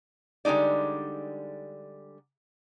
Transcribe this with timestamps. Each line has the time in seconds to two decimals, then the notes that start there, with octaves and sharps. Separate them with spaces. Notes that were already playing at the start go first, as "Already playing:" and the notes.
0.45 D3 G3 G#3 D#4 D5